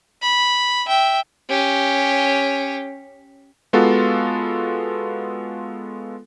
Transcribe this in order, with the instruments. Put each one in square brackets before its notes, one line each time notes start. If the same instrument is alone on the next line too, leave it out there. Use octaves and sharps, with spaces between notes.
[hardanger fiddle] B5
E5 G5
C#4 G4
[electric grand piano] G#3 B3 F4 F#4 A4